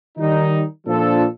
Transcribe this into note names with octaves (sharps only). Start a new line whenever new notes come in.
D#3 G3 D#4
A#2 F3 D4 A4